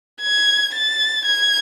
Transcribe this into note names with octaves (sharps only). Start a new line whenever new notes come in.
G#6
A6
G#6